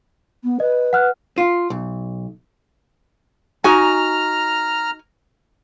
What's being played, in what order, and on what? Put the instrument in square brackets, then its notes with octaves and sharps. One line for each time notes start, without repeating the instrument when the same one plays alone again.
[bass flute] B3
[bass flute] B4 [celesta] D#5
[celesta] F#5 F6 F#6
[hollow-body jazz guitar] F4
B1
[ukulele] D#4 F#4 G#5 [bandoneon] A#5 F6